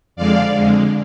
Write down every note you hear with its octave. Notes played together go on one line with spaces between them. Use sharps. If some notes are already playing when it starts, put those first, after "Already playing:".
F2 D3 G#3 D5 F5
F2 D3 G#3